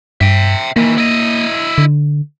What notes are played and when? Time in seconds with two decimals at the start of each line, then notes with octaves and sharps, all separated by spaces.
0.21 G2 E5 G5
0.76 D#3 E3 A#3
0.98 E4 D#5
1.78 D3